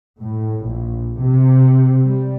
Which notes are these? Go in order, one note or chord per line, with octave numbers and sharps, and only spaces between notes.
A2
A#1
C3
G3